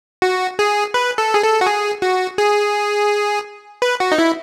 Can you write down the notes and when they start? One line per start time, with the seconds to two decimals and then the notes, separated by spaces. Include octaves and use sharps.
0.22 F#4
0.59 G#4
0.94 B4
1.18 A4
1.34 G#4
1.43 A4
1.61 F#4
1.67 G#4
2.02 F#4
2.38 G#4
3.82 B4
4.00 F#4
4.12 D#4
4.18 E4